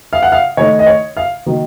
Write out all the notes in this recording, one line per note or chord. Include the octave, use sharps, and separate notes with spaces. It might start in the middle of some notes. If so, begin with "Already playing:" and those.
F5
F#5
F5
D#3 A3 D#4 C#5
D#5
C#5
F5
D#3 F#3 A#3